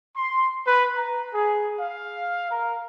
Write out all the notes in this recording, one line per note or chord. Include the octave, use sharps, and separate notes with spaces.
C6
B4
A#5
G#4
F5
A#4